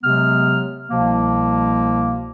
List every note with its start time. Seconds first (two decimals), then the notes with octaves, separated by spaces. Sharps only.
0.03 C3 F#3 G#3 B3 F6
0.90 C2 B2 F3 A#3